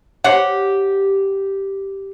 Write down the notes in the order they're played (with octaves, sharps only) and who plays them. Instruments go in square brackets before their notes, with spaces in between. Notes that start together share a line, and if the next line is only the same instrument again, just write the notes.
[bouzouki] G4 [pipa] C5 C#5 F#5